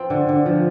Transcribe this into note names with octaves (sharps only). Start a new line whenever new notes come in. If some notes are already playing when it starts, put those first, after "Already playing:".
Already playing: F3 C4
D3
D3
F3